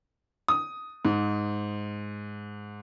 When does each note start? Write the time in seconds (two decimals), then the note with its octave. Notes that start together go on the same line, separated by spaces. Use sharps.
0.48 D#6
1.05 G#2